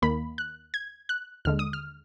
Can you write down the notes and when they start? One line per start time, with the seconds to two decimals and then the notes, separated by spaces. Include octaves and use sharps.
0.02 D#2 D#3 A#3 B5
0.38 F#6
0.74 G#6
1.09 F#6
1.45 D#2 D3 G#3 F6
1.59 D#6
1.73 F6